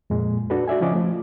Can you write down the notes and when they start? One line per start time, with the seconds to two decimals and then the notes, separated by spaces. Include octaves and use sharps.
0.10 F2 A#2 G#3
0.50 D4 F#4 A4 B4
0.68 F#4 D5 E5 G#5
0.81 C#3 F3 C#4 D#5 D6
0.93 F3 A3